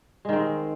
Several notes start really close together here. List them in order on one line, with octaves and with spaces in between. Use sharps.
G#3 D#3 C4